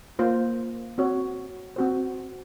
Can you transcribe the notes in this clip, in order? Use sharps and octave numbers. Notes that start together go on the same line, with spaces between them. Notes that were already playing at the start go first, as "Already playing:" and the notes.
A#3 F4 C5
C4 F#4 C#5
C4 F#4 C5